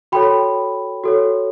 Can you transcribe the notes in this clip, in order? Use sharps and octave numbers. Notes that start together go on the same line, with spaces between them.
F#4 A4 C#5 G5 B5
F#4 A4 C#5